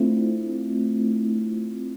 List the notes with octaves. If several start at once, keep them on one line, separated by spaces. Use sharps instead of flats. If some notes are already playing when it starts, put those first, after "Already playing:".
Already playing: A3 C4 D4 E4 F4